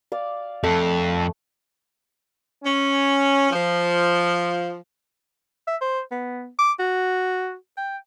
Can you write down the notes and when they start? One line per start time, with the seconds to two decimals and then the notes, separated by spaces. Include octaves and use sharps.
0.12 D5 F5
0.64 F2 A3
2.63 C#4
3.50 F3
5.67 E5
5.81 C5
6.11 B3
6.59 D6
6.79 F#4
7.77 G5